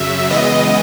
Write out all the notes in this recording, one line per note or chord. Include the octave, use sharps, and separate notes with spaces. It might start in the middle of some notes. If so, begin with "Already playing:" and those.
Already playing: F#2 C#3 F#3 E5
C#3 E3 G#3 B3 D#5